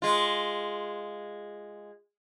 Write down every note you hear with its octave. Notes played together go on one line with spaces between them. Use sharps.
G#3 F4